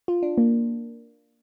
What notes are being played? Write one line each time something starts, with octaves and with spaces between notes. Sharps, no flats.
F4
D4
A#3